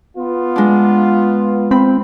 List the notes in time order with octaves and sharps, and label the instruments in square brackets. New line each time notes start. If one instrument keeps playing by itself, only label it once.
[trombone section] B3 F4
[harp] G#3 D4
[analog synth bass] C4 [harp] B5